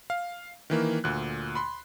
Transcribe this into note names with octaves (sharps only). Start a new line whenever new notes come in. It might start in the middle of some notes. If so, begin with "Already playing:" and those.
F5
D#3 E3 A#3
D2 A#2 F#6
B5 C6